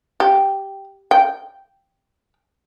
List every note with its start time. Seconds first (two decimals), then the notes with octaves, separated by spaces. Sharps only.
0.20 G4
1.11 G5